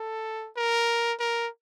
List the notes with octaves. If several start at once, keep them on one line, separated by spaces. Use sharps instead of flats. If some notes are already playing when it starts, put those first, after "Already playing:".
Already playing: A4
A#4
A#4